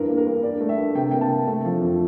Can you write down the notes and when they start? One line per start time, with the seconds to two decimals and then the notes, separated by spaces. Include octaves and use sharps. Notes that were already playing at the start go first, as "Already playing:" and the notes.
Already playing: E2 G2 A#4
0.08 A#3
0.17 A#4
0.26 G2
0.43 G2 D5
0.60 A3
0.69 E5
0.78 G2
0.95 C3 G5
1.11 A#3 G5
1.21 A5
1.29 C3
1.47 A3
1.65 F3
1.81 F2